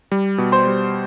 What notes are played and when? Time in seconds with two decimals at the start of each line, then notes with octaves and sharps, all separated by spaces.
0.12 G3
0.38 B2
0.52 C5 C6
0.67 G3